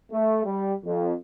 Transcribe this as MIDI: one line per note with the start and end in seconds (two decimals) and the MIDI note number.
0.12 0.42 57
0.45 0.74 55
0.84 1.13 41